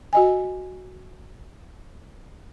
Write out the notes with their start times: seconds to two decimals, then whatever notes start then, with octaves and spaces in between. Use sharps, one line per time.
0.13 F#4 D#5 G#5